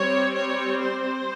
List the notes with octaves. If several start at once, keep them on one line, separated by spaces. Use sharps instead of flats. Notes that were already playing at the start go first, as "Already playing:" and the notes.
Already playing: G3 C4 C#5
C#5
C5